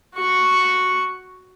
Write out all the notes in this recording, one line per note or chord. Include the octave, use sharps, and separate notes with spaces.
F#4 C#6